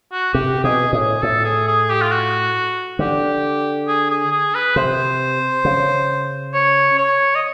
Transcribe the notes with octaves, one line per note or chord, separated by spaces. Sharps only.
F#4
C3 G4
B2 G#4
A2 G#4
A2 A4
G#4
G#4
G4
F4
F#4
D3 G4
G#4
G#4
G#4
B4
C3 C5
C#3
C#5
C#5
D#5